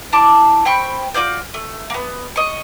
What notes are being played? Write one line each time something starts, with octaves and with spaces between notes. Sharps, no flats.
D4 E4 A5 D6
C4 G5 B5 C#6
F4 F#4 D5 G6
A3
A#3 B3
D#5 C#6